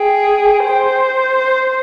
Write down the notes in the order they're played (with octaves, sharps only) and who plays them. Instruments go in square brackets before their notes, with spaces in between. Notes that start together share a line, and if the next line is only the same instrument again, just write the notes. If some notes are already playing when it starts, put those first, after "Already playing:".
Already playing: [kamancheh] G#4 [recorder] G5
[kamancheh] C5 [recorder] G5